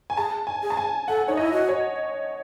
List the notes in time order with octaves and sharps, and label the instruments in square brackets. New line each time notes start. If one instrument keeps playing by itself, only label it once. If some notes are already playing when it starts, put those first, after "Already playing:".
[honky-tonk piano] G#5
[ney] G#4 [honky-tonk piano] A5
[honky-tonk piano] G#5
[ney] G#4
[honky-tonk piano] A5
G#5
[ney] A4 [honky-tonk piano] F#5
[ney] D#4 [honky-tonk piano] C#5
[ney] E4 [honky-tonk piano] D#5
[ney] F#4
[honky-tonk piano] C#5